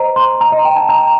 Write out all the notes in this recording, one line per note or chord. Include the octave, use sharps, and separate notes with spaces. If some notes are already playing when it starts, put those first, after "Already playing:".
Already playing: C5 D#5 A#5
C6
A#5
D#5
G5
A5
A#5